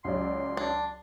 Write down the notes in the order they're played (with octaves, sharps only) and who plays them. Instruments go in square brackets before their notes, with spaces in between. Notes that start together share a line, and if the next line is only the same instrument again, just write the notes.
[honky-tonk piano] C#2 F#3 D5 [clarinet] C6
[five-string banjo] D4